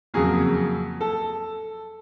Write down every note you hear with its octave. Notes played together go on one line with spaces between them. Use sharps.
F2 C#3 F#3 A#3 G#4
A4